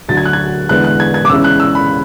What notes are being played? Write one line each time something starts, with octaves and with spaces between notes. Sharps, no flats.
D2 D3 F#3 A6
G#6
F#6
G#6
E2 D3 G#3 B3 E4 F#6
F#6
G#6
G#6
D6
E2 C#3 G#3 C#4 E4 E6
F#6
E6
B5